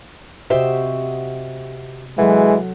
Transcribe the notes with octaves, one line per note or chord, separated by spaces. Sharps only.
C3 F#4 G4 C5 D#5 E5
E3 F#3 G#3 A4 F#5